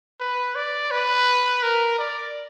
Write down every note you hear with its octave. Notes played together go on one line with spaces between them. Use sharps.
B4
D5
B4
A#4
D5